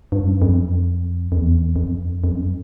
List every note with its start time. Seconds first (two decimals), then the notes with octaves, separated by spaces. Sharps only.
0.12 G2
0.23 F#2
0.42 F2
1.32 F2
1.37 E2
1.76 F2
2.24 F2
2.33 F#2